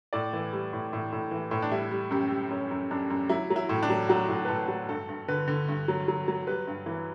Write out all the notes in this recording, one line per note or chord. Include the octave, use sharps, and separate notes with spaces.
A2 D5
E3
G3
A2
A2
A2
E3
A2
D4
G3 E4
G3
F#2 G4
G3
F#2 C#4
F#2
F#2 D4
F#2
F#3 E4
F#3
E4
A2
D4
F#3
F#3 F#4
A2
B4
A2 A4
F#3
G2 A4
G2
D3 B4
D3
G2
F#3
F#3
F#3
G3 B4
G2
E3